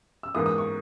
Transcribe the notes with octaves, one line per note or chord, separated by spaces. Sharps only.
E6
G#2 E3 A#3 D#6
D#6
C#6